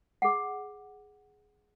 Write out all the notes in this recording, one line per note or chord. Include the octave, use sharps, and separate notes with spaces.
G#4 F#5